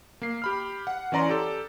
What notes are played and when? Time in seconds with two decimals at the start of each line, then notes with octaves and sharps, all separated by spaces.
0.22 A#3 C7
0.42 G4 B5 F6
0.87 F#5
1.12 E3 C#4 D5 A#5 C6
1.29 G4 A4